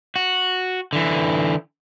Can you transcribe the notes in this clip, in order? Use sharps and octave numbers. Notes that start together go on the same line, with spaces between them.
F#4
D3 E3